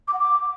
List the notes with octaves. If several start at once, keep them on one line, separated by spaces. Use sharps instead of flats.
D6
F#5
D6